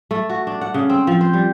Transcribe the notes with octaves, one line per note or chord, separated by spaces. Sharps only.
A3
F#4
D4
F#5
C#3
C4
F3
C5
G3